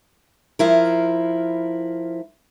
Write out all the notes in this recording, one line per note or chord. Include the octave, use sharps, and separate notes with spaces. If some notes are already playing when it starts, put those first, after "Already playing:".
F3 E4 A#4